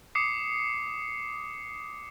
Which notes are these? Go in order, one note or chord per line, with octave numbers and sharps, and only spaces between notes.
D6 D#6 C7 C#7